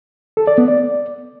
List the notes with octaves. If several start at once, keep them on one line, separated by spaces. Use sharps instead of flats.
A4
D5
B3
D5